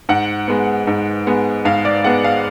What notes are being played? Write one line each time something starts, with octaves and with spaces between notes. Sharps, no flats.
G#2 F#5
G#3 B3
G#2
G#3 B3
G#2 F5
D5
G#3 B3 F#5
F5